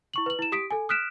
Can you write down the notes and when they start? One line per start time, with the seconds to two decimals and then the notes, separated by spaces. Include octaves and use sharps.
0.14 E4 C#6 F#7
0.26 B4 F#7
0.39 E4 E7
0.52 G4 D#6 B6 D7
0.71 A4 G#5
0.89 D#6 F6 F#6 B6 D7 E7